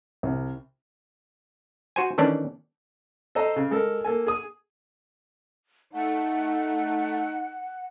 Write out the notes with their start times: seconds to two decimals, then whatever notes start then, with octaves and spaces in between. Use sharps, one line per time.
0.23 C2
1.96 F#4 C5 G#5
2.18 D#3 E3 A3 C#4 D4
3.35 A4 C5 D#5 A#5
3.56 C#3
3.71 G#3 A4 A#4
4.05 A#3 A4 G#5
4.27 G#4 D#6
5.94 A3 D#4 F#5